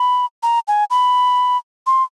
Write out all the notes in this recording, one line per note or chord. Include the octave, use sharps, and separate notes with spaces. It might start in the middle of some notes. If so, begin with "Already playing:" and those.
Already playing: B5
A#5
G#5
B5
C6